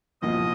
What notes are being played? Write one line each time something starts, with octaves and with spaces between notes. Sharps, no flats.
C2 A#2 F3 C4 D#5